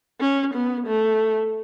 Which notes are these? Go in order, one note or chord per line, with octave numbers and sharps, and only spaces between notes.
C#4
B3
A3